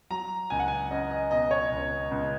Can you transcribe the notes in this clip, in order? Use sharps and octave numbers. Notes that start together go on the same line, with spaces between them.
F#3 A#5
C#2 G#5
F#5
G#5
C#4 D#5
D#5
B2 D#5
C#5
C#2
C#2